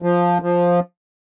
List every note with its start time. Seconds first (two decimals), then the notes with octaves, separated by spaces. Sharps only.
0.02 F3
0.42 F3